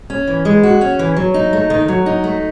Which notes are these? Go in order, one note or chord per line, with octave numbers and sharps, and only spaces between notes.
C#4
E3
G#3
F#4
C#4
E3
F#3
D#4
A3
D#3
F#3
D#4
A3